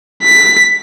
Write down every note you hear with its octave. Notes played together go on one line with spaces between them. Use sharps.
B6